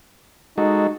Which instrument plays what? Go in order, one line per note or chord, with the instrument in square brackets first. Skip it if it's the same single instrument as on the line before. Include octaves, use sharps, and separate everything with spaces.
[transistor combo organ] G#3 F#4 A4 [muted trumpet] D#4